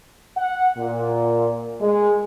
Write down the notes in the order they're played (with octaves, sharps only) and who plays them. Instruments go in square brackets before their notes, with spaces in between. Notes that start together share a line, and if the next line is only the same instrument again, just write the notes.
[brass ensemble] F#5
A#2
G#3